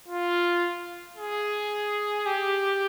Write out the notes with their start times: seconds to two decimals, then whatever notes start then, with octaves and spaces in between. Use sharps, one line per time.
0.08 F4
1.16 G#4
2.26 G4